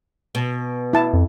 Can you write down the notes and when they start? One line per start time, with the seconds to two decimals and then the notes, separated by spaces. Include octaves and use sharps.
0.35 B2
0.93 E4 A5
1.13 F2